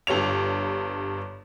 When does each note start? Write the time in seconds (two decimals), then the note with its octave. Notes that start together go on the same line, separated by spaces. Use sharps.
0.07 G1 G2 C#5 F7